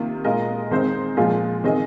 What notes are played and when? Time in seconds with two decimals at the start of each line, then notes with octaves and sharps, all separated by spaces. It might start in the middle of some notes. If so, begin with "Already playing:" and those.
Already playing: C3 D#3 A#3 F4
0.24 A#2 G#3 F4 A#4 D#5
0.71 D#3 G#3 C4 D#4 C5
1.17 A#2 F3 G#3 F4 G#4
1.64 D#3 C4 G#4 D#5